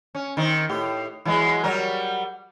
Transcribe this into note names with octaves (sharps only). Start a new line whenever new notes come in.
C#4
D#3 C4
A2 G4
E3 F#3 G#3
F#3 G3 A#4